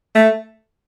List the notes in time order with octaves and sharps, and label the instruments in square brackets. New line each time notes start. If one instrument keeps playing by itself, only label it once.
[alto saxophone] A3